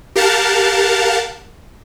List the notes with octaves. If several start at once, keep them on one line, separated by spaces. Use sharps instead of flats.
G4 A#4 F5 F#5 A5